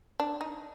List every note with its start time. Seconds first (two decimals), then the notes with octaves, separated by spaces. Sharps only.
0.20 D4
0.41 D#4